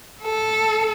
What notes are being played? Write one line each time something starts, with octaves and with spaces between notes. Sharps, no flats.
A4